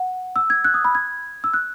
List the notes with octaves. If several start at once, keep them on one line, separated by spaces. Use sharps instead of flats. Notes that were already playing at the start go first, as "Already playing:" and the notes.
Already playing: F#5
E6
G#6
F#6
D#6
B5
G#6
E6
F#6